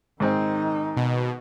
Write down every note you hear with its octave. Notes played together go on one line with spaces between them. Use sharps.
G#2 D#3 C4 D#4
B2